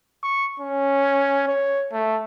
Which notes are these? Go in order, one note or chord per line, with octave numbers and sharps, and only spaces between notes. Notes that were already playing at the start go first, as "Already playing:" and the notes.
C#6
C#4
C#5
A3